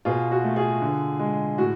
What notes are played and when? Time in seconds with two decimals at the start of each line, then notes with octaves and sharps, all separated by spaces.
0.05 B2 F4 G#4
0.31 F#4
0.44 A3
0.56 F4 G#4
0.82 D3
1.19 G#3
1.58 A2 F#4